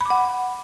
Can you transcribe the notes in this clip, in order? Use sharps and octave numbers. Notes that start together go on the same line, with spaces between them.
F#5 B5 D6